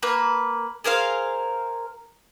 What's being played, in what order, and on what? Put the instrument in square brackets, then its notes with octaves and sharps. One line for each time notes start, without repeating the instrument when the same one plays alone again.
[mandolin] A#3 B4
G#4 A#4 C5 F5